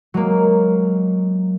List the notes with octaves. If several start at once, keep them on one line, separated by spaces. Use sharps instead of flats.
F#3 G#3 A#3